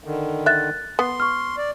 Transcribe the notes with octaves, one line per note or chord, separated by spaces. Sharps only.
D3 D#3
E5 F#6 A6
B3 C6
C#6 F6
D5